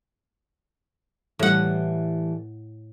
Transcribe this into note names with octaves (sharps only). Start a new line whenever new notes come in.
A2 E3 G3 A3 F#5